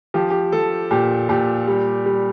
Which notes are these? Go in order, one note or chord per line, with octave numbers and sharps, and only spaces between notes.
F3 G4
G4
F3 A4
A#2 G4
A#2 G4
G3
G3